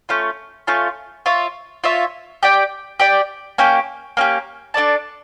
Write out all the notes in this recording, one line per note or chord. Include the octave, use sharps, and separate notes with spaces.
A3 C#4 F4
A3 C#4 F4
F4 C#5 E5
F4 C#5 E5
G4 D5 G5
G4 D5 G5
A#3 C#4 G4
A#3 C#4 G4
D4 A4 D5 A5